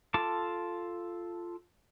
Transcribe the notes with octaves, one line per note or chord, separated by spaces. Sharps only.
F4 A4 A5 D6